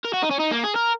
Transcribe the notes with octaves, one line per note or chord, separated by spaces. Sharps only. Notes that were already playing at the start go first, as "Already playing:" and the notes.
A#4
F#4
D#4
C#4
D#4
A#3
G#4
A#4